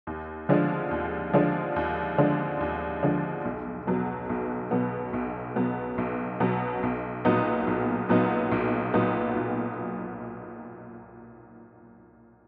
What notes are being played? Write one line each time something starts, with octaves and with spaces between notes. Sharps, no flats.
D#2
D3 F3 G#3 D4
D#2
D3 F3 G#3 D4
D#2
D3 F3 G#3 D4
D#2
D3 F3 G#3 D4
B1
B2 F#3 B3
B1
B2 F#3 B3
B1
B2 F#3 B3
B1
B2 F#3 B3
B1
A#2 F#3 B3 D#4
B1
A#2 F#3 B3 D#4
B1
A#2 F#3 B3 D#4
B1